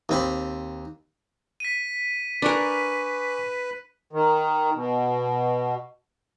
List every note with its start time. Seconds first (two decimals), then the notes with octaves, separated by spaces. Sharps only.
0.09 D#2 C4 B5
1.60 B6 D#7
2.42 D4 A#4 B4 G#5 C#6 D6
4.13 D#3
4.75 B2